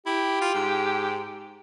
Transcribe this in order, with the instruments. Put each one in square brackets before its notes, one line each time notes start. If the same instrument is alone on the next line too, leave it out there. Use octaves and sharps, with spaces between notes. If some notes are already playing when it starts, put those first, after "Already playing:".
[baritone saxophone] E4 [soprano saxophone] G4
[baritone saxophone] F4
G#2